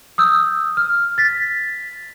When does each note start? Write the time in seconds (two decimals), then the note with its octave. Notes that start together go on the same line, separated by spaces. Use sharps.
0.18 D#6 E6 G6
0.77 F6
1.18 A6 B6